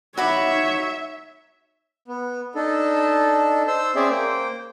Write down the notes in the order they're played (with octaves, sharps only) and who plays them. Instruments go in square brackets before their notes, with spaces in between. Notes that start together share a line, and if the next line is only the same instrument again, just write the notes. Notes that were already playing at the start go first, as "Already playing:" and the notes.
[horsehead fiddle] D#4 C#5 [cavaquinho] F#4 B5 D6 [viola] E5
[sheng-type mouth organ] B3
D4 D#4 A4
C5 C6 E6
C4 C#4 G#4 C5 D5 E5
A#3 C5 G5